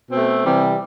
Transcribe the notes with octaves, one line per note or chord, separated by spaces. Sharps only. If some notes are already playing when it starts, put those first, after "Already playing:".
B2 A3 C4
C3 E3 G3